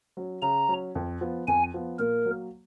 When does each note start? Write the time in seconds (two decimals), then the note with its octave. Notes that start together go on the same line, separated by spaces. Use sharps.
0.17 F#3 C#4
0.42 C#3 A#5
0.69 F#3 C#4
0.95 F2
1.21 F3 B3
1.48 F2 G#5
1.74 F3 B3
1.99 A#2 A#4
2.25 F#3 A#3